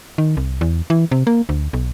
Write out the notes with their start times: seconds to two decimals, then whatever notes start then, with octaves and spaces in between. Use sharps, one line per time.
0.18 D#3
0.37 C2
0.61 E2
0.90 E3
1.11 C3
1.27 A#3
1.49 D2
1.73 B1